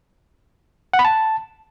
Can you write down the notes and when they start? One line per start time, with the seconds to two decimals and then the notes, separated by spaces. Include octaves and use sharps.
0.93 F#5
0.99 B5
1.05 A5